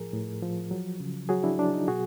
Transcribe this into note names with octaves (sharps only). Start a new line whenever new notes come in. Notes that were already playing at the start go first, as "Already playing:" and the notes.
Already playing: A2 F3 G#4 A#4
A2
F3
F#3
C#3
F#3 F#4 G#4
D4 E4
F#3 D4
D#4
B2 F#4 G#4